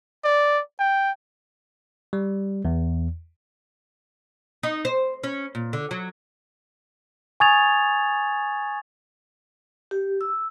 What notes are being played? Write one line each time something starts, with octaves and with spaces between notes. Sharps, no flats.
D5
G5
G3
E2
D#4
C5
C#4
A#2
D3
F#3
G#5 C#6 D#6 G#6 A6 F7
G4
E6